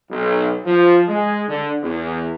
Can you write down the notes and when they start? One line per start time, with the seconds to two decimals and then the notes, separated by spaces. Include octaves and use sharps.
0.11 B1
0.66 F3
1.08 G#3
1.48 D3
1.83 E2